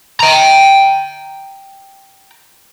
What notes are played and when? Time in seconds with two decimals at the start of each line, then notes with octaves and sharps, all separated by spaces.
0.20 G5 A#5